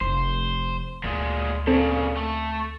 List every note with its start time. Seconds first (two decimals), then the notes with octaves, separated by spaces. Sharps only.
0.01 F1 A3 C5 C6
1.04 D2 A#2 G#3
1.67 A#2 C#3 C4 A4
2.17 A3